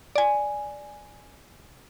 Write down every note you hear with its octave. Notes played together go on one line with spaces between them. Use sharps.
D5 G#5